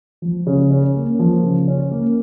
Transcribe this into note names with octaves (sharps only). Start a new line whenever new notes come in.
F3
C#3
C#4
A#3
F3
C#3
C#4
A#3